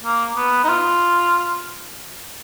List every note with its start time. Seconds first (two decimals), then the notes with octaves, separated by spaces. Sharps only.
0.03 A#3
0.36 B3
0.64 D#4
0.69 F4